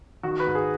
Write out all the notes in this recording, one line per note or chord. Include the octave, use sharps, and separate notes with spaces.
D#3 F#4
B4
G#2
G#4